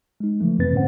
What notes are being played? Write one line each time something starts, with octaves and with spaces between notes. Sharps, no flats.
G#3 D#4
C#3 E3 F3 A3
F2 C3 A#3 C4 B4 A6
G#2 D3 C#4 C5 F#5